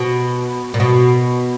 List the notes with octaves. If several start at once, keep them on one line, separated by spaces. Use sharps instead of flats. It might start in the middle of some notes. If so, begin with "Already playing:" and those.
Already playing: B2
A#2
B2